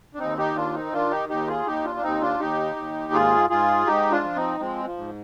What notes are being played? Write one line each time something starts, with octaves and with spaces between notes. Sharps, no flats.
D4
D#2 C4 D#4
D#4 G4
D#3 D4 F4
C4 D#4
D#3 D4 F4
D#4 G4
D#2 D#4 G4
F4 G#4
D#2 D#4 G4
D4 F4
D4
D#2 C4 D#4
D4 F4
D#2 D#4 G4
D#2
G#2 F4 G#4
G#2 F4 G#4
G#2 D#4 G4
D4 F4
F3
C4 D#4
F3 G#3 C4
F3
G#2